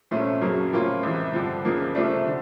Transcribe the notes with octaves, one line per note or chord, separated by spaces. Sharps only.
C2 A#2 F3 A3 C#4
F#2 C#3 F#3 A#3
A2 F3 A#3 C#4 F4
C#2 C3 E3
G2 D3 F3
C#2 C#3 F3 A#3
C2 C3 F3 A3 D4
D3